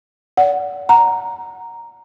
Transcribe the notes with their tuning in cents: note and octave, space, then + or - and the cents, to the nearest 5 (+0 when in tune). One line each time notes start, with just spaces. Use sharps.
D5 -35 F#5 +0
F#5 +0 A#5 +0